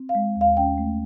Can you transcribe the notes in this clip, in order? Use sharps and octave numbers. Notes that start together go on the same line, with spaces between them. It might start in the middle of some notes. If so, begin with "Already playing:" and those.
Already playing: C4
F5
G#3
D#2
F5
C#4 G5
A3